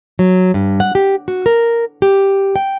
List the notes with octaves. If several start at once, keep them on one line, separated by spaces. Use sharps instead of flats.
F#3
G2
F#5
G4
F#4
A#4
G4
G5